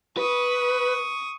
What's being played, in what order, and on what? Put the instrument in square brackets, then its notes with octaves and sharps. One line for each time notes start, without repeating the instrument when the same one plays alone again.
[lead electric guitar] B4 [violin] C#6 D#6